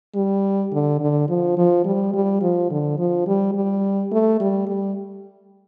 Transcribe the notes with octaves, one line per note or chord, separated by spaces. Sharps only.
G3
D3
D3
F3
F3
G3
G3
F3
D3
F3
G3
G3
A3
G3
G3